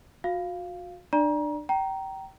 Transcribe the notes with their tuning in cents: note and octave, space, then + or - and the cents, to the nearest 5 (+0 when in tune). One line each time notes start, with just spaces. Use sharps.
F#4 -35 F5 -5
D4 +35 D5 +0 A#5 +25
G5 -25 A#5 +0